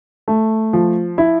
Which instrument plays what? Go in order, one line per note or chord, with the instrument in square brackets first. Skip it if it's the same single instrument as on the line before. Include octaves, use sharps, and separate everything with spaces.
[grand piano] A3
F3
E4